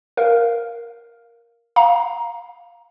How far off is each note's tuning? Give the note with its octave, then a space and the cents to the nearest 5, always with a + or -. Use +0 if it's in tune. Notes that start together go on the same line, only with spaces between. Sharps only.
A#4 +5 F5 -5
F5 +5 A#5 +15